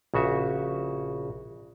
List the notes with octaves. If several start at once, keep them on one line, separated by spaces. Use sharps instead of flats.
A#1 C#3 F#4 E5